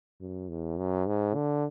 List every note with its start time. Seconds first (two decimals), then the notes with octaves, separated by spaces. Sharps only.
0.20 F#2
0.49 E2
0.77 F#2
1.07 G#2
1.35 D3